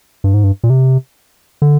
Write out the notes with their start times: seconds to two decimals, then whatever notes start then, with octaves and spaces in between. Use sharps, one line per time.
0.24 G2
0.34 G#2
0.44 G2
0.64 A#2
0.70 C3
1.62 D3